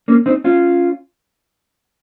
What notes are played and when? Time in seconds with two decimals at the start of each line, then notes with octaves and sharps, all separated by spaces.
0.08 A#3 C#4
0.26 C4 D#4
0.44 C#4 F4